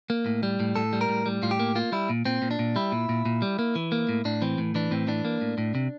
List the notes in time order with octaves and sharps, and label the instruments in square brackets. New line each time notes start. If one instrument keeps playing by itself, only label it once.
[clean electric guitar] A#3
A2
G3
A2
A2 A4
G3
A#4
A2
G3
A2 F4
G4
A#3
A#3 F4
G3 E4
A#2
A#2 C4
A#2
D4
A#2
G3 E4
A#2
A#2
A#2
G3
A#3
E3
A#3
A2
A2 D4
E3 C4
A2
E3 D4
A2 C4
E3 D4
A#3
A2
A2
C3